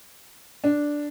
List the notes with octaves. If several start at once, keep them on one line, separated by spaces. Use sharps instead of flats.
D4